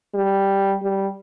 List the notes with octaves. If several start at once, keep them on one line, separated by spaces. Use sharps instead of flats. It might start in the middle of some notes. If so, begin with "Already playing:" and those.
G3
G3